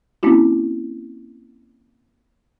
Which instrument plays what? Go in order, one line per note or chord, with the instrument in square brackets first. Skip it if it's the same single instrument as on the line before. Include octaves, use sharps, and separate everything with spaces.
[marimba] A#3 C4 C#4 E4 F#4